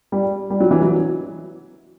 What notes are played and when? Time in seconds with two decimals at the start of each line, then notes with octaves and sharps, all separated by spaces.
0.12 G3
0.50 G3
0.60 F#3
0.71 E3
0.82 F#3